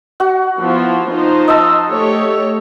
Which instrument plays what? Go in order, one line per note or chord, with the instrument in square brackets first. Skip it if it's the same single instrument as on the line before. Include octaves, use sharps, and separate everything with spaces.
[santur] F#4 F#5
[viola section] F3 B3 E4
F3 D#4 C5
[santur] D#5 A5 E6
[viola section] A3 G4 C#5